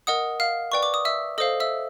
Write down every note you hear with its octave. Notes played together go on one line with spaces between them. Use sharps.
A#4 D#5 F#5 D#6
F5 F6
B4 D5 G5 C#6
D6
D#6
E5 E6
A4 C5 D#5 F5 D#6
E5 E6